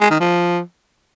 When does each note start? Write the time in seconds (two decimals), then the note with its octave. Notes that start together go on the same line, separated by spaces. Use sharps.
0.01 G#3
0.10 D#3
0.20 F3